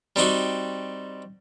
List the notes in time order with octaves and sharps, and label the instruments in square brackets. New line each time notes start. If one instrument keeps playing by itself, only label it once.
[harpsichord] G3 C4 D#4 F#4